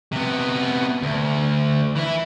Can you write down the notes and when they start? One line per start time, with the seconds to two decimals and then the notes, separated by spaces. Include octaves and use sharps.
0.12 C3 B3
1.02 D2
1.96 E3 E4